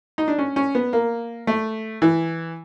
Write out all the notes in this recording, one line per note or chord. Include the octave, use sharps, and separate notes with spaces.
D#4
D4
C#4
C#4
B3
A#3
A3
E3